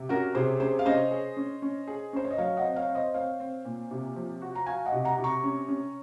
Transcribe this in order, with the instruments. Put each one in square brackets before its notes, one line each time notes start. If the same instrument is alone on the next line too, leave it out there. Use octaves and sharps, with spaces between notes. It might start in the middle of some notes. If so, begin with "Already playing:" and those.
Already playing: [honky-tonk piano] C3
[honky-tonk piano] C#4 [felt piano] F#4 A#4
[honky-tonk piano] C3 [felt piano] G#4 C5
[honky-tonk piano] C#4 [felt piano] G#4 C5
[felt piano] F5
[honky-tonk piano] C#4 [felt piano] C5 D#5
[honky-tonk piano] G#4
C#4
C#4
G#4
[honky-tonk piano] C#4 [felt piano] C5
[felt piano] C#5
D#5
[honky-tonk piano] F#3 [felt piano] C#5 F5
[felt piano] D#5 F#5
[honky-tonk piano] C4
[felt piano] C#5 F5
[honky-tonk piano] C4
[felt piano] C5 D#5
[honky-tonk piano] C4 [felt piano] C#5 F5
[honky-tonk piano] C4
A#2
C3
F3
F#4
[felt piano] A#5
[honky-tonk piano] F#4 [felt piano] F5 G#5
[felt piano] D#5 F#5
[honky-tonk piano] C3
[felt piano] F#5 A#5
[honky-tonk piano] C3
[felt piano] A#5 C#6
[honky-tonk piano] C#4
C#4